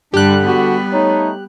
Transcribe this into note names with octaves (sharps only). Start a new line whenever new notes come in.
G2 D3 G3 D4 G4 F#6
G3 B3 F#4
A3 D#4 C#5